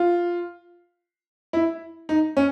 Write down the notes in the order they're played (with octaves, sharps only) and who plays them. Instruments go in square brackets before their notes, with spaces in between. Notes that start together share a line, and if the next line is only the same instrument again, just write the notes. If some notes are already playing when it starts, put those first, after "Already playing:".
Already playing: [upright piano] F4
E4
D#4
C#4